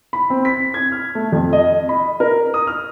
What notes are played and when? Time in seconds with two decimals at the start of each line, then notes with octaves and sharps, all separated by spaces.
0.13 B5
0.30 C4
0.45 B6
0.74 G#6
0.92 F6
1.15 A3
1.32 F2
1.53 D#5
1.89 B5
2.20 A#4
2.54 D#6
2.67 F6